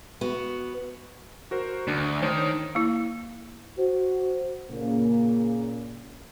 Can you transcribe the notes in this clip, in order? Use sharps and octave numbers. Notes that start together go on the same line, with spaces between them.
B3 F#4
F#4 A#4 C5
D2 D4
D#3 D4 C5 C#5
A#3 E4
F#4 C5
A#2 C#3 A#3